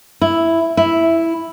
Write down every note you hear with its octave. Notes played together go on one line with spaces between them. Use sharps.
E4
E4